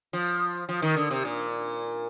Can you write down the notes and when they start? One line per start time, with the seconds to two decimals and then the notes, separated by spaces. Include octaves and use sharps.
0.13 F3
0.69 F3
0.82 D#3
0.97 D3
1.10 C3
1.25 A#2